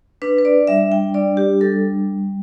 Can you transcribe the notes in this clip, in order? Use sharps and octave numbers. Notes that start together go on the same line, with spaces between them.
D4 B4
B4
D5
G3 E5
G5
D4 D5
G4
G3 A4